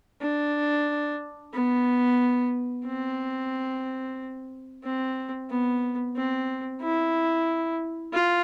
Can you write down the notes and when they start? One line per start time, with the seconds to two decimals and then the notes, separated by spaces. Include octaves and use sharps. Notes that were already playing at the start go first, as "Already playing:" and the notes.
0.21 D4
1.54 B3
2.85 C4
4.84 C4
5.50 B3
6.16 C4
6.82 E4
8.13 F4